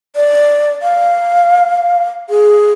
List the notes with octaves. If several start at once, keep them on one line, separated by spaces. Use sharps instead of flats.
D5
F5
G#4